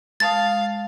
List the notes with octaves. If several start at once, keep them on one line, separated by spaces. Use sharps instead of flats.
G#3 F5 A5 D#6 A6